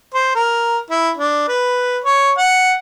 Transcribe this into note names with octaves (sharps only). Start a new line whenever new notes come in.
C5
A#4
E4
D4
B4
C#5
F#5